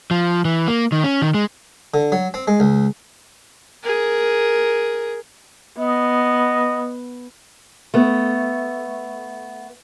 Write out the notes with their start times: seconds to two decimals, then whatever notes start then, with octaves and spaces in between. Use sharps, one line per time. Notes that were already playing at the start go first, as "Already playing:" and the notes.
0.11 F3
0.45 E3
0.68 A#3
0.92 D#3
1.04 C#4
1.22 D#3
1.34 G#3
1.94 D3
2.12 F#3
2.34 C4
2.48 G#3
2.60 C#2
3.83 G#4 A#4
5.78 B3 D#5
7.94 A3 B3